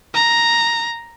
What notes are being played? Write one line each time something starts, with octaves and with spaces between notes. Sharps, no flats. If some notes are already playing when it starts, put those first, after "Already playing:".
A#5